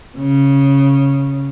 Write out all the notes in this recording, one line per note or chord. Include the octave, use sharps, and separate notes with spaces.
C#3